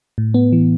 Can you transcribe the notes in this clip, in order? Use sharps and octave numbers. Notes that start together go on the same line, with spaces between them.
A2
B3
E3